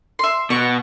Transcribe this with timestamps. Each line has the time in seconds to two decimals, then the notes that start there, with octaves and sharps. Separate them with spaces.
0.19 E5 C6
0.50 B2 C#6